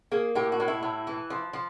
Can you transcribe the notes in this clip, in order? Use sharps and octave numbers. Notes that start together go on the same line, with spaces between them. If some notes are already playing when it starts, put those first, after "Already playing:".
A#3 G#4
A2 G4
F#4
A2
E4
A2
E3
F3
F3